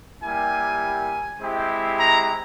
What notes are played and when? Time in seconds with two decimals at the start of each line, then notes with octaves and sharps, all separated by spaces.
0.22 G3 A#3 E4 G4 G#5
1.39 G#3 C4 E4 G4
1.97 A#5